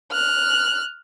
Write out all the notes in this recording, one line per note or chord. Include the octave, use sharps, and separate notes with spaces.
F6 F#6